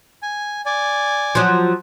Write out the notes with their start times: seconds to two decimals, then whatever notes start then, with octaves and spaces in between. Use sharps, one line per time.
0.23 G#5
0.66 D5 G#5
1.35 F3 F#3